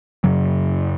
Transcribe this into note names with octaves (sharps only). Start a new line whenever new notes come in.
F#2 C#3 F#3